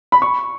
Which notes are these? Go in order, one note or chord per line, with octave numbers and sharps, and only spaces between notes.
B5
C#6